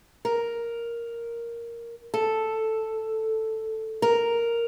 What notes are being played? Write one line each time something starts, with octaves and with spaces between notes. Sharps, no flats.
A#4
A4
A#4